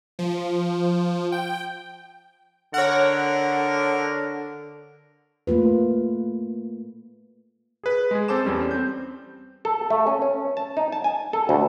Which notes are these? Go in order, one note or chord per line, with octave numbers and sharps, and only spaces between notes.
F3
G5
D3 A#4 C#5 F#5
A3 A#3 F4 B4
G#4 B4
G#3 G#4
C4 A4 C5 A5 D6 E7
E2 G3 C#4
C4 G6
A4
A3
C#4
C#4
A5
D#4
A5
G#5
A4
D2